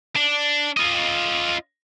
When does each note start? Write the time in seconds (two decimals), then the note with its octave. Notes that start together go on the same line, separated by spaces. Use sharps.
0.16 D4
0.77 F4 D#5